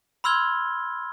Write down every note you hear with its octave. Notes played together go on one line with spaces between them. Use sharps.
B5 C6 E6 F6 G#6 G7